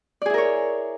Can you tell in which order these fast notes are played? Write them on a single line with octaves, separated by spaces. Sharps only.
D5 G#4 E4 A#4 C#5